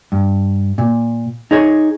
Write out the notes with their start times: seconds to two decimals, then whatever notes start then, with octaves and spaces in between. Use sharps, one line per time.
0.12 G2
0.78 A#2
1.51 D#4 G#4 C#5